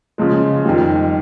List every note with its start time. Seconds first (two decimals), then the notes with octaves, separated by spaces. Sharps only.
0.18 C#3 F3 G#3
0.65 F2 D#3 G3